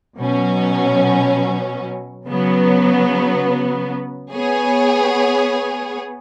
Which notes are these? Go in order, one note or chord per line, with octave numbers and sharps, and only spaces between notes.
B2 F#3 C#4
C#3 F#3 B3
B3 G#4 C#5